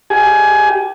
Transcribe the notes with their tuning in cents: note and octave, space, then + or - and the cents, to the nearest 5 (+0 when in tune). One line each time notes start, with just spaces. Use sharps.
G4 -10 G#5 +20